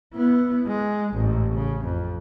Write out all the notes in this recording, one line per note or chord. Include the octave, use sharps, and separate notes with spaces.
B3 E4
G#3
A1 G#2
C#3
F2